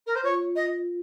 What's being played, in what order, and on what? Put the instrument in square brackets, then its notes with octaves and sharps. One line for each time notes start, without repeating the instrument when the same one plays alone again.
[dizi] A#4
C5
[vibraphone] F4 [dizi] C#5
[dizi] D#5